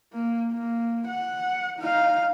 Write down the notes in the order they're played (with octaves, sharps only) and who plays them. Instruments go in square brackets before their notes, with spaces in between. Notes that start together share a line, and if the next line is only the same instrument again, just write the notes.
[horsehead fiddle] A#3
A#3
F#5
D#4 F5